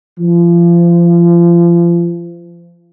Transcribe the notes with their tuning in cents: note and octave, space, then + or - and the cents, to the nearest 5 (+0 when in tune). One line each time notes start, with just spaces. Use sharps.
F3 -30